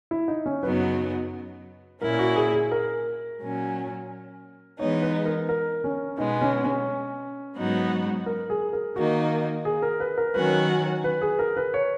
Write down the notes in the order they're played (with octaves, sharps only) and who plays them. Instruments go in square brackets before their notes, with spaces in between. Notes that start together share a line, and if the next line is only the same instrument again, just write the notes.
[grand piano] E4
D#4
C#4
[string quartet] F#2 C#3 F#3 B3 D#4 [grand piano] B4
[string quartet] A#2 A#3 C#4 E4 [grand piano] A#4
[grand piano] F#4
G#4
G#4
A#4
[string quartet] A#2 F#3 C#4
[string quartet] E3 G#3 B3 D#4 [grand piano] C#5
[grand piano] B4
A#4
A#4
C#4
[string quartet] B2 G#3 B3 [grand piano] D#4
[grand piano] C#4
C#4
[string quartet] G#2 F#3 B3 D#4 F#4
[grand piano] A#4
G#4
A#4
[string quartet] D#3 A#3 D#4 [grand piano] F#4
[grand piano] G#4
A#4
B4
A#4
[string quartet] D#3 F#3 C#4 F#4 [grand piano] B4
[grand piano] B4
G#4
A#4
B4
C#5